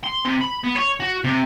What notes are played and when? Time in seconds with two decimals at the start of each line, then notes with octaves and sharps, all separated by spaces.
0.04 C6
0.25 C3
0.41 B5
0.64 B3
0.76 C#5
1.00 F#4
1.24 C3